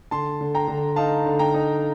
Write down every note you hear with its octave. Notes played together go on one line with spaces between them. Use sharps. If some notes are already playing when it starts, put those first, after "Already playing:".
D3 A5 C6
D3
G5 A#5
D3
D#4 F5 A5
D3
G5 A#5
D#4